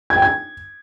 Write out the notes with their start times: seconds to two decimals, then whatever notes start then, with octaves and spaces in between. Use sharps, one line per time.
0.10 G#6
0.16 G5
0.22 G#6